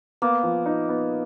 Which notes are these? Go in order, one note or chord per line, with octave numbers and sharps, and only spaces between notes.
A#3 B3
F3
D#4
B3